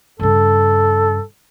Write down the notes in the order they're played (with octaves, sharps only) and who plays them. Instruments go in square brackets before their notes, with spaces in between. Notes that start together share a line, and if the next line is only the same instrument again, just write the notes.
[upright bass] G2 C#3 [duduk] A4